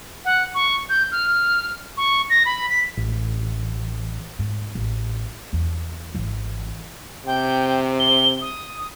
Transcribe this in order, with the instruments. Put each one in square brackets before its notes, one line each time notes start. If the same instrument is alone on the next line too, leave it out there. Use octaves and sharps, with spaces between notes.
[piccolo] F#5
C#6
G6
F6
C#6
A#6
B5
B6
[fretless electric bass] A1
[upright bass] G#2
A1
E2
G#1 E3
[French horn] C3 [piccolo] G5
[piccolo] G7
D#6